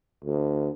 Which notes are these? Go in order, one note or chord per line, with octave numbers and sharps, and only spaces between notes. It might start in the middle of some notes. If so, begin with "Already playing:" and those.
D2